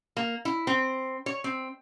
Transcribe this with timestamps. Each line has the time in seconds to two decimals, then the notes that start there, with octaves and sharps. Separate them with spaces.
0.17 A#3
0.45 E4
0.67 C4
1.26 C#5
1.44 C4